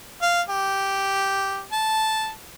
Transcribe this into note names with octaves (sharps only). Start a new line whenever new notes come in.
F5
G4
A5